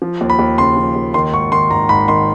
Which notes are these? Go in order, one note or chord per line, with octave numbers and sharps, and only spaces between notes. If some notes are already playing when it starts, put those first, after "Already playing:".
F3
D#2
B5
D#2
C#3 C6
F3
D#2
D#3 C6
G#1 C#6
D#3 C6
G#1 A#5
G#1 B5
D#3 C6